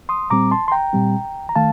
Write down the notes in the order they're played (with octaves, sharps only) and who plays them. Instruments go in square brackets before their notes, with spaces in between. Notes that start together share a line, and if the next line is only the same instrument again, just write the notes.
[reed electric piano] C6 D#6
A#2 G3 C4 A#5 D6
A5 C6
C6
G5 A#5
A#2 G3 C4
A#5
D#3 A3 F5 A5